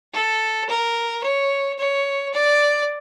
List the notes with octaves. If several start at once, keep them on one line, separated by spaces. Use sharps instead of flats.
A4
A#4
C#5
C#5
D5